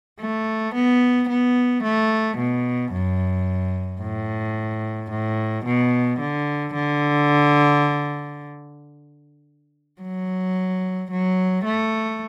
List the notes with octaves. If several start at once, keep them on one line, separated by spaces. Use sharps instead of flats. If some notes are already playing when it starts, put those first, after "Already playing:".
A3
B3
B3
A3
B2
F#2
A2
A2
B2
D3
D3
F#3
F#3
A3